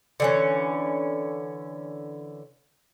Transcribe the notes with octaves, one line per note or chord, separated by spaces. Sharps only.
D3 E3 C#4